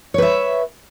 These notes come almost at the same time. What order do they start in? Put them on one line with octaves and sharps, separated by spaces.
C#5 B4 E5